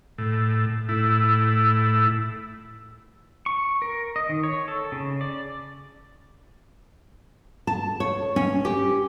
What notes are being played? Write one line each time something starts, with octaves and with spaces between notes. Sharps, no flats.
A2
A2 E4
C#6
A#4
D#5
D#3
C#5
A4
C#3
D5
A5
C#5
C#4
G4